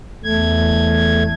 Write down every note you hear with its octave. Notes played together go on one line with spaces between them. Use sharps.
E2 A3 G#6